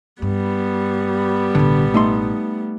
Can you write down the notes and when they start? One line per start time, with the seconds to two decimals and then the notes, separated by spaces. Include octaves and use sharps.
0.22 G2 G3 B3
1.55 A1 B2 D3
1.94 A3 D#4 C6